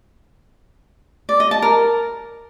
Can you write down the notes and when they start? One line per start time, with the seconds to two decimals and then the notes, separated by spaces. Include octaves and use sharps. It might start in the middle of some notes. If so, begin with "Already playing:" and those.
1.29 D5
1.40 D#5
1.51 A5
1.62 A#4